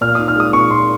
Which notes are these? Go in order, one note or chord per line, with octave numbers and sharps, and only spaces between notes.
A#2 F6
D#6
D#4
F6
G#3 D#6
A#2 C#6
A#2 C6